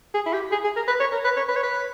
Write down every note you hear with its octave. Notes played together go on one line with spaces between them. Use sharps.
G#4
E4
G4
G#4
G#4
A#4
B4
C#5
A#4
B4
C#5
B4
C#5
B4